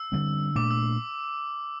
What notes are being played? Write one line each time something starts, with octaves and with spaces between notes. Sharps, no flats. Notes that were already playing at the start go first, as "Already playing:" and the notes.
Already playing: E6
D3 G3 C4
A#2 A3 D4 D6
E6